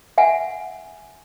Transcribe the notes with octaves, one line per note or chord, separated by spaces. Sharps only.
E5 F#5 G#5